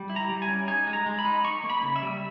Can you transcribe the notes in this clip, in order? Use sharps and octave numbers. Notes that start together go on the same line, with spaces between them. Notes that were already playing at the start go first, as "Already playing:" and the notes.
Already playing: G3
E4
A#5
G3
G#5
C#4
D#4 G#5
G#3
A#5
G#3
B5
D#4
D#4 C#6
A#3
B5
C#3
E5
G3